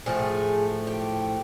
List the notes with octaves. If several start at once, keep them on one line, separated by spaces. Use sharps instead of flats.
A2 F3 A3 G#4
G4